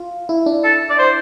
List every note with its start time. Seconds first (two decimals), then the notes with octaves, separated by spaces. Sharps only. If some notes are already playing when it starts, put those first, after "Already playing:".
Already playing: F4
0.29 E4
0.46 D4
0.64 A4
0.90 D5
0.99 C5